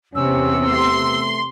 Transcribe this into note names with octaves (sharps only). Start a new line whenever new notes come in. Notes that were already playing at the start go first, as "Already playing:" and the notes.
E2 C3 B3 C#4 E6
A3 C6